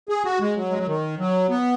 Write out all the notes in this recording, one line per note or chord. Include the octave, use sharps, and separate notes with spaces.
G#4
F#4
G#3
F#3
G#3
F#3
D#3
F#3
B3